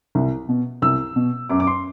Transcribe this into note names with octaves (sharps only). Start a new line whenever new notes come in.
C2
B2
C2 E6
B2
F#2 D6
D6
C6